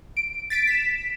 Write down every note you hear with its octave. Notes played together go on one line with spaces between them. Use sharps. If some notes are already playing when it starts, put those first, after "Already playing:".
D7
A6 B6 D7
B6 E7